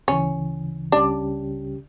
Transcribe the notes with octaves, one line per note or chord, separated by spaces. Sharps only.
D2 C#3 E3 C#4
C#2 C#3 G3 C#4 D4 G4